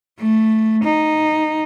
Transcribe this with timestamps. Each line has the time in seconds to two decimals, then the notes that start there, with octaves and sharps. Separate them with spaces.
0.20 A3
0.84 D#4